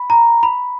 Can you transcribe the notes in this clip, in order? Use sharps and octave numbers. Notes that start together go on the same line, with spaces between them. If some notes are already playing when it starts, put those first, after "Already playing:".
Already playing: B5
A#5
B5